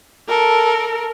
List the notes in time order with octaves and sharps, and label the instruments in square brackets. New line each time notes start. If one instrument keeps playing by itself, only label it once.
[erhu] A4 [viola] A#4